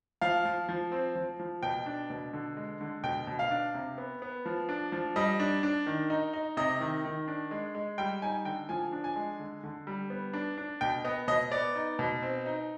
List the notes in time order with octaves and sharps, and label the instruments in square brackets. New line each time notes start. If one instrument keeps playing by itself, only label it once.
[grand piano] F3 F5
F3
F3
C4
F3
F3
B2 G5
D4
B2
D3
G#3
D3
B2 G5
B2
F5
D4
C3
B3
B3
F3
D4
F3
G3 D#5
D4
D4
D#3
D#4
D#4
C3 D#5
D#3
D#3
D4
G#3
G#3
G3 G5
D#4 G#5
D3 G5
F3 G#5
D4
G#5
G#3
D3
D3
G3
B3
D4
D4
B2 G5
B3 D#5
B2 D#5
B3 D5
D#4
B2
C4
D#4